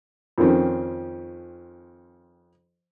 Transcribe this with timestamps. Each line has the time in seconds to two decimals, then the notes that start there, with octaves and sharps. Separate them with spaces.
0.38 F2 D#3 F3 C4 C#4